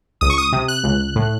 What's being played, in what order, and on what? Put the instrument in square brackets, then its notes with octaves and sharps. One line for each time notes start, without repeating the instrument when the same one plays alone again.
[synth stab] C#2 D#6
C#6
D#6
C3
F#6
C#2
A2